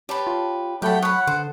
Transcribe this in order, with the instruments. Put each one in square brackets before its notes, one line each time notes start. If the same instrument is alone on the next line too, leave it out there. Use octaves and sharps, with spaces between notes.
[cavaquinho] G4 B4 [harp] C#5 A5 G6
[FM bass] F4
[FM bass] F#3 [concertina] A3 G5 [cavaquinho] G4 A4 [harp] F#5 B5 F#6
[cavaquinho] C#5 B5 [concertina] F#5 [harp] D#6
[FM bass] D3 [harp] A4 [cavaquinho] C5